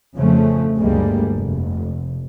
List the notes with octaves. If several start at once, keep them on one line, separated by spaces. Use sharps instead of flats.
F2 C#3 F3 A3 C#4
G1 D2 G3 G#3 A#3
F1